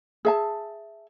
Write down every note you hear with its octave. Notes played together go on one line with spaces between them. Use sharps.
G#4 E5 A5